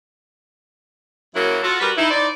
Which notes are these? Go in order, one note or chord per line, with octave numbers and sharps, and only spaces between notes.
F#2 C#3 F#3 A#3 E4 A#4
F4 F#4 A4
G3 F#4 G4 A#4 B4
D#4 E4
D#4 E4 C5 D5